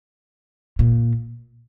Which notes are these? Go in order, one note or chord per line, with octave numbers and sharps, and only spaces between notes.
A#2